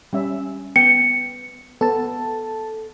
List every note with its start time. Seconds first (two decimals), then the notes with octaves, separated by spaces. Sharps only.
0.13 G3 C#4 E5
0.76 B3 G5 C#7
1.81 B3 A4 A5